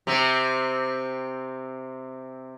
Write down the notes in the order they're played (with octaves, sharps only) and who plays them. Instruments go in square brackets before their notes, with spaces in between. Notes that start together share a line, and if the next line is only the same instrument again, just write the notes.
[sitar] C3 C4